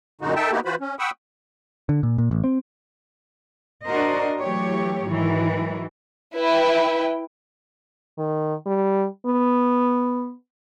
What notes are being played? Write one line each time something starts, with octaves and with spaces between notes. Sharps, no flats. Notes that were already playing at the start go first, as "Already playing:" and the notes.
F#2 A#2 D3 G#3 D#4 F#4
D#3 D#4 A4 E5 G5 A5
A#3 B3 D#4 E4 F#4 G4
E3 F4 F#4 B4 C5 B5
C#4
F#5 G5 B5 C#6 D#6 E6
D3
A#2
A#2
A1
C4
D4 F#4 A#4 C5 D#5
E3 F#3 A3 G4 C#5
G#2 D#3 E3 F#3
E4 B4 G5
D#3
G3
B3